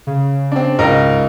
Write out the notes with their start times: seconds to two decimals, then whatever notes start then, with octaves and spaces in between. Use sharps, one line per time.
0.07 C#3
0.52 C4 D4
0.79 C#2 G#2 A#4 D#5